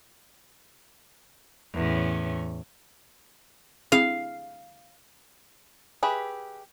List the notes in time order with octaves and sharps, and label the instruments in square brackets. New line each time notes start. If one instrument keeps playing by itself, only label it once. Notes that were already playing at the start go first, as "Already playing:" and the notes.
[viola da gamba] E2 A2 C#4
[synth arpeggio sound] C4 E4 G#4 [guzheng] F5
[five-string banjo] G4 G#4 B4 E5